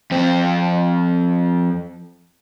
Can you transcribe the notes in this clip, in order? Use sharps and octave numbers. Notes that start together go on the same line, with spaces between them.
F2 C4